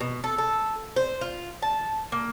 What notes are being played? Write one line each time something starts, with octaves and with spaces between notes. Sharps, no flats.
B2
A4
A4
C5
F4
A5
A#3